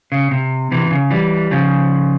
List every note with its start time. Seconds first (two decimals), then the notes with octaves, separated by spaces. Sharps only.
0.12 C#3
0.31 C3
0.71 C3 E3
0.88 C3
0.91 C#3
1.11 E3 G3
1.51 C#3 F3